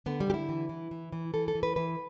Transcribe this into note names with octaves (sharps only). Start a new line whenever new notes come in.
D3 B3
G3
D3 G4
E4
E3
E3
E3
E3
E3 A4
A4
E3
B4
E3 B4